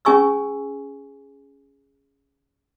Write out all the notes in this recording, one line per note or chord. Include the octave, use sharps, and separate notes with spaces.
C#4 G#4 G#5 C#6 E6